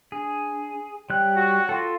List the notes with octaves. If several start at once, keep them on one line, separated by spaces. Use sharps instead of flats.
D4 G#4
G3 C#5 G5 F#6
F#4
F4 A4